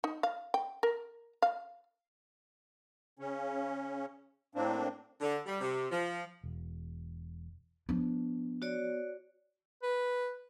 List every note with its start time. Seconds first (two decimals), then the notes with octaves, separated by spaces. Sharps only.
0.04 D#4
0.23 F5
0.54 G5
0.83 A#4
1.42 F5
3.19 C#3 C#4
4.55 A2 A#3 C4 D4
5.21 D3
5.46 G3
5.61 C3
5.91 F3
6.44 E1
7.89 F3 B3 D4
8.62 F#4 C#5 D5
9.83 B4